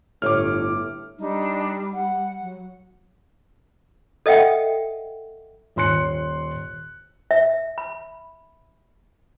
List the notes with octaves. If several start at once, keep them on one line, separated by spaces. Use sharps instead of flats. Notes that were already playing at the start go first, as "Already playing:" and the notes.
G1 A2 D6 F6
G3 D4 D#4
F#5
F#3
A4 D#5 E5 F#5 G5
D#1 C#5 C6 F#6 C#7
E5
B5